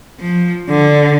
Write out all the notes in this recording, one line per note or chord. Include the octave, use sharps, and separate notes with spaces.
F3
D3